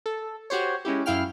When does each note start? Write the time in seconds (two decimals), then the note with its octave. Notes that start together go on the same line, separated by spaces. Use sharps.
0.06 A4
0.50 F#4 G4 C5 C#5
0.85 G#3 C#4 E4 G4
1.06 F#2 E4 F5 G5 F6